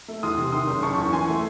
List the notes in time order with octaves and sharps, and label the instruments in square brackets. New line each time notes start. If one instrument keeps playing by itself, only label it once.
[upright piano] A3
E2 C6 D#6
C3
D#3 C6 D#6
F#1
F#1 A5 C#6
E2
E3 G#5 C6
A3